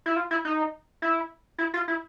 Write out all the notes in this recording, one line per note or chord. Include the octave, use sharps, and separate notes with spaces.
E4
F4
E4
D#4
E4
E4
F4
E4